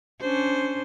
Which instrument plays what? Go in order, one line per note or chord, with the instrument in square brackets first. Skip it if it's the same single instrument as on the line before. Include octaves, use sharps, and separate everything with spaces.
[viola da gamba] C#4 D4 C5